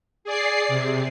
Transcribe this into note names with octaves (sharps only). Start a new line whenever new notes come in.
G#4 D5 C7
C3